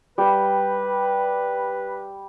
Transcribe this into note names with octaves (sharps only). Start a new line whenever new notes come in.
G3 B4 G5